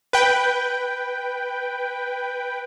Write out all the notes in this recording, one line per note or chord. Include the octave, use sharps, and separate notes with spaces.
B4 G5